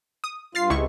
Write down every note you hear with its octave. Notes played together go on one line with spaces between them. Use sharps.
D#6
G2 F4 F6 A6 C7
C#2 C3 G#3 E4 C#6